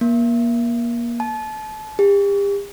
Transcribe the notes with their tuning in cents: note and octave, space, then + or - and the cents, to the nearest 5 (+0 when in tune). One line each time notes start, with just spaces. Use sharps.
A#3 +30
A5 -30
G4 +40